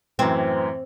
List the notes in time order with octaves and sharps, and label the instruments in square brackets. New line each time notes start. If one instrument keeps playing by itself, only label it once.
[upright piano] F#2 A2 E3 [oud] C4